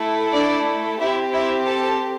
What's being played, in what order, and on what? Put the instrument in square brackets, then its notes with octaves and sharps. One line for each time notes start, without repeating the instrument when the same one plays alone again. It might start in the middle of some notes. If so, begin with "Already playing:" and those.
Already playing: [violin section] A3 E4 A4
D4 D5
C4 E4 G4 E5
E4 E5
A4 A5